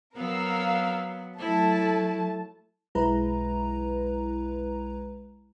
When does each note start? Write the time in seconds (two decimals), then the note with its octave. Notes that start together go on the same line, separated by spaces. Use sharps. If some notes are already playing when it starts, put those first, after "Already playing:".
0.16 F#3 B3 A#4 F5 E6
1.39 F#3 A3 E4 A5
2.95 B1 G#3 E4 B4 A#5